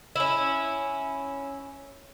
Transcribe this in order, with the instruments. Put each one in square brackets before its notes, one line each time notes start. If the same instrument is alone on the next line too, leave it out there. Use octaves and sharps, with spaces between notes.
[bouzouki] C#4 E4